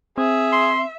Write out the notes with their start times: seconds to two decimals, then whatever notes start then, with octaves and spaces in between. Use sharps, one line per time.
0.18 C4 G#4 E5
0.53 C6